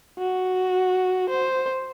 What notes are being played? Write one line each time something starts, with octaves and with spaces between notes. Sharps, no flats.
F#4
C5